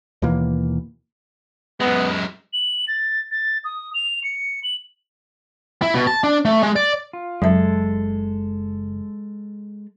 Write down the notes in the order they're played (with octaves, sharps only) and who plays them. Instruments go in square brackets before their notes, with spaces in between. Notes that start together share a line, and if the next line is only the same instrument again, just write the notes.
[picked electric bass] D#2 B2 E3 A#3
[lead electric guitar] F#2 G#3 [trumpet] B3
[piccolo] F#7
A6
A6
D#6
F7
C#7
F#7
[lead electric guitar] E4
B2
A5
D4
A3
G#3
D5
[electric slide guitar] F4
[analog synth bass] F#1 [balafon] F#3 E5 [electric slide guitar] G#3 A4